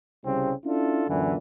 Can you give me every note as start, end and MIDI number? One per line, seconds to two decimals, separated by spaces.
0.24 0.52 36
0.24 0.52 49
0.24 0.52 55
0.24 0.52 60
0.64 1.05 61
0.64 1.05 62
0.64 1.05 64
0.64 1.05 65
0.64 1.05 69
1.08 1.35 42
1.08 1.35 46
1.08 1.35 50
1.08 1.35 52